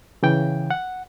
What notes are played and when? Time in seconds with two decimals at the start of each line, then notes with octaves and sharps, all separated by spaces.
0.23 C#3 E3 G5
0.71 F#5